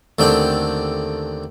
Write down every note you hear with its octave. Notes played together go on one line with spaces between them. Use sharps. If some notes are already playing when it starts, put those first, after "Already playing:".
D#2 D3 A3 C4 D4 G5